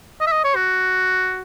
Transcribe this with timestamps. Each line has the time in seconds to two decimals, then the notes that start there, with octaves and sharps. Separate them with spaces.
0.21 D#5
0.27 E5
0.32 D#5
0.44 C#5
0.55 F#4